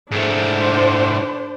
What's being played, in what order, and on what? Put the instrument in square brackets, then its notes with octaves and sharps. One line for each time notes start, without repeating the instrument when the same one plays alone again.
[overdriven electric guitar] G#2 A3 [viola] D4 C5